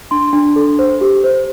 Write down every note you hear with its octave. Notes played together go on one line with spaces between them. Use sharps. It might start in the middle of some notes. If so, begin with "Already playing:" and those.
D4 C6
D4
A4
C5
G4
C5